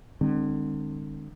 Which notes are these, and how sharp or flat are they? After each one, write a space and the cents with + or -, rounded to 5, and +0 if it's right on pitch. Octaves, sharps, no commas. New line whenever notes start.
D3 +35 G#3 -35 C4 +0